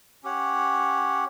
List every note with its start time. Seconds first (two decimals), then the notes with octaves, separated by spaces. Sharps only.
0.23 C#4 G4 C#5 F#5